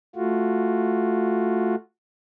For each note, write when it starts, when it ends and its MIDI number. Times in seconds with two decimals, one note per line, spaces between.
0.16 1.75 57
0.16 1.75 65
0.16 1.75 66